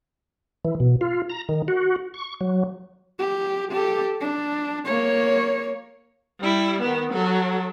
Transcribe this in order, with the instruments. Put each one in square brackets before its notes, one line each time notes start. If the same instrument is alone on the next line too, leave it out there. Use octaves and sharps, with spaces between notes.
[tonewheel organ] E3
B2
F4
A#5
D#3
F#4
C#6
F#3
[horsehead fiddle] G4
G4 A4
D4
A#3 C#5
[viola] G3 E4
D#3 B3
F#3 A4